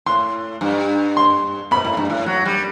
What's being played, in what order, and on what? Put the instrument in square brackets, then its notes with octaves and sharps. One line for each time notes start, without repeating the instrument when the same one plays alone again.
[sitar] A2 [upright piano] C6
[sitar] G2
[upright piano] C6
[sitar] B2 [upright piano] B5
[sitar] A2
G2
A2
F#3
G3